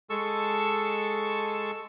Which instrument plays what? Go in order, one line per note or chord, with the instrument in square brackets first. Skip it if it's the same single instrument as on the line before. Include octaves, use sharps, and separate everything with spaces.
[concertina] G#3 A4 A5 C#6 E6